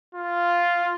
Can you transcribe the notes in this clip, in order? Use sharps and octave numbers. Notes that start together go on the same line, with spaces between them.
F4